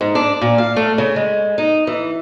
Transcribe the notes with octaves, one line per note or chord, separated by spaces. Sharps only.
G#2
D4
A#2
F5
A3
C#3
G#3
D#4
E3